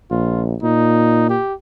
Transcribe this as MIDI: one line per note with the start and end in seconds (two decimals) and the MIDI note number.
0.11 0.54 34
0.11 0.42 65
0.63 1.36 46
0.63 1.29 63
1.29 1.54 67